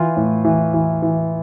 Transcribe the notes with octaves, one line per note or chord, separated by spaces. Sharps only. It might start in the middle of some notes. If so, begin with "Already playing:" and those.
Already playing: E3 F4
A2
E3
E3
E3